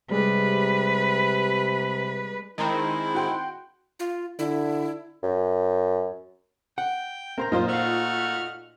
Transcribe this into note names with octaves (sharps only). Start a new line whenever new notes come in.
C3 G3 G#3 B4
D#3 G#3 C4 E4 A#5
F#4 G5 C6
F4
D3 E4
F#2
F#5 G5
C4 A#4 C5 A#5
F#2 A#2 D#4 F4 C5
A3 F#4 C5 F5 F6